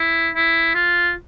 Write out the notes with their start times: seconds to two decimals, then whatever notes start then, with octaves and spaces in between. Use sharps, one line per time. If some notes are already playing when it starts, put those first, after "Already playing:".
Already playing: E4
0.34 E4
0.75 F4